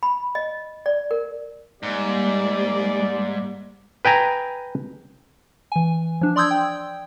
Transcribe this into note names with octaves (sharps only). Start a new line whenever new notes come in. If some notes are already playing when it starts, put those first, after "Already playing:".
B5
D#5
D5
A#4
G#2 G3 A#3 D5
B4 G5 G#5 A#5
E3 G#5
F3 D4
D5 C6 D#6 E6 G6 G#6
G5